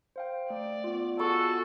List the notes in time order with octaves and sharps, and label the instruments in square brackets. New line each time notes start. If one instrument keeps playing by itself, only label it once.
[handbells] C5 F5 G5
[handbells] A3 [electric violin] D5
[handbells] B3 F4
[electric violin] F#4 G#4 [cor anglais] A4 [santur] C#6